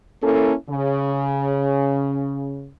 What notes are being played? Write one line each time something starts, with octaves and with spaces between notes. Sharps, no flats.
A#3 C#4 E4 A4
C#3